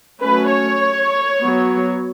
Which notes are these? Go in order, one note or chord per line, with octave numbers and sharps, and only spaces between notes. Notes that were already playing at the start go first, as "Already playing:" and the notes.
F#3 A3 C#4 B4
C#5
F#3 B3